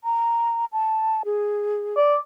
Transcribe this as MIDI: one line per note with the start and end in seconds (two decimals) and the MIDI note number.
0.04 0.65 82
0.72 1.22 81
1.25 1.95 68
1.96 2.15 74